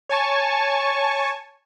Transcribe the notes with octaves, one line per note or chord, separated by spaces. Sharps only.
C#5 G#5 A5 C#6